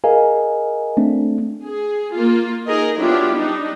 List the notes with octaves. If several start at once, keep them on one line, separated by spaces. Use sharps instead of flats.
G#4 A#4 D#5 F5 G#5
A3 C4 D4
G#4
A#3 F4
D#4 G#4 A#4 D#5
F#3 B3 D4 E4 F4 G4
G3 D4 D#4